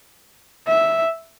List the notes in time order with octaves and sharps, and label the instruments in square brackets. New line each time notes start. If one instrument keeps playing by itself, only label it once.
[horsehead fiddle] E5